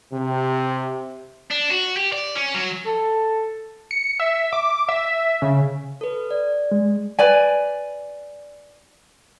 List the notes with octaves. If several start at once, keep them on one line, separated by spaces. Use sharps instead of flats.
C3
D4
F#4
G4
D5
C#4
F#3
A4
C#7
E5
D6
E5
C#3
A4 B4
D5
G#3
B4 D5 G#5